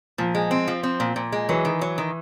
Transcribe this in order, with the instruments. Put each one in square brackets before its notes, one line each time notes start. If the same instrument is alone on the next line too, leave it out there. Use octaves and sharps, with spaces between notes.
[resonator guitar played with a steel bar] A#2 [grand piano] F3
[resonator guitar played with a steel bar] G#3
C4
F3
C4
A#2
A#2
G#3
[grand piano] E3 [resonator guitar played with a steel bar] F#3
[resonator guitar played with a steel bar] D#3
F#3
D#3